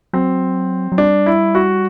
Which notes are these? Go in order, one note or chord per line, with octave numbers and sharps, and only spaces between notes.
F#3 C4
F#3
G3 D4
E4
F#4